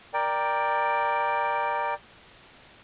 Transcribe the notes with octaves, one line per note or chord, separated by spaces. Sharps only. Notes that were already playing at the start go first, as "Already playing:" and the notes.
A#4 D5 G5